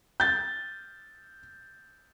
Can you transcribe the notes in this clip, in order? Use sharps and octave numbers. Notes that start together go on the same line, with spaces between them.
G6 A6